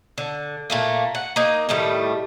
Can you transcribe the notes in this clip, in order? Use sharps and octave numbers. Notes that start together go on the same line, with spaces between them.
D3
A#2 A3 A#3
F#5
A#3 D#4
A2 D#3 G3 A3